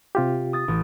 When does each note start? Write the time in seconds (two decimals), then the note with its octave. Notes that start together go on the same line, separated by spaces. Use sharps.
0.15 C3 F4 G4
0.53 D#6 A6
0.68 A1